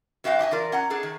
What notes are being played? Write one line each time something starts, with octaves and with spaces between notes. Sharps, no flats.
F#2 F#4 E5 F5 G5
D4 D#5 E5 G#5
E3 F4 A#4 D5
C#4 F#5 A#5
D4 G#4 A4
D#3